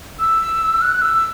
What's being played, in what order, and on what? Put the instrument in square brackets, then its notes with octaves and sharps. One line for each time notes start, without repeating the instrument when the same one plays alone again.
[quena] E6
F#6
E6